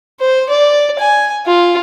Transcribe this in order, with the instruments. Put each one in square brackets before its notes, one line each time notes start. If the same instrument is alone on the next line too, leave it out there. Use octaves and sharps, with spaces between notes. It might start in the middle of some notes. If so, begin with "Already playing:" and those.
[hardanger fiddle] C5
D5
G#5
F4